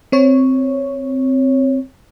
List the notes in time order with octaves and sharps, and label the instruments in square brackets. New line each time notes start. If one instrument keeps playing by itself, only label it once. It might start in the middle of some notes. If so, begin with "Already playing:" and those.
[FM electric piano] C4 C#5